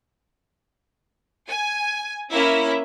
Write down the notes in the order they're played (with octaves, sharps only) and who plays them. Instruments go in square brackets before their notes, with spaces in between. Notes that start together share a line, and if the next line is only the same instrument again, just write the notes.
[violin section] G#5
A#3 C#4 E4 E5